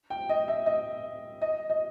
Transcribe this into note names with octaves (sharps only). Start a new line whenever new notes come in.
G5
D#5
E5
D#5
D#5
D#5